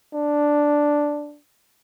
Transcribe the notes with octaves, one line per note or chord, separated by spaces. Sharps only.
D4